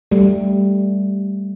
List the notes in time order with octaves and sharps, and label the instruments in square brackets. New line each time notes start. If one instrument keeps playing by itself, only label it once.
[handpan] G3 A3